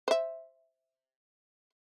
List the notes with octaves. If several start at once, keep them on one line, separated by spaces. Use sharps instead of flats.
C5 E5